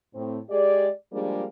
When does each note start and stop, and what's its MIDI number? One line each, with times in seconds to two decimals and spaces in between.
0.15 0.38 45
0.15 0.38 60
0.50 0.89 56
0.50 0.89 67
0.50 0.89 68
0.50 0.89 74
1.12 1.44 53
1.12 1.44 55
1.12 1.44 56
1.12 1.44 58
1.12 1.44 62
1.12 1.44 68